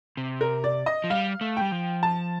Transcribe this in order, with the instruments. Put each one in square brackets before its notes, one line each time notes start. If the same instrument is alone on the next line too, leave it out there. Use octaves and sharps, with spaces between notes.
[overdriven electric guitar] C3
[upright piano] A#4
D5
D#5
[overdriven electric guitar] F3
[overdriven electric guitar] G3 [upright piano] F5
[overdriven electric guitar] A3
[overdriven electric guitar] G3 [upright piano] G5
[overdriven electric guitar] F3
[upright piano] A5